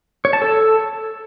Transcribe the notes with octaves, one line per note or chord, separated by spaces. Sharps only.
C#5
A5
A4